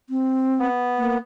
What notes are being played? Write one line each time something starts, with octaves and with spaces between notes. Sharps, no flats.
C4
B3
A#3